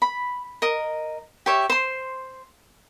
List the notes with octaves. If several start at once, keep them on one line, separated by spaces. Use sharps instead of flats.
B5
A#4 D#5
G4 C#5 E5
C5 C6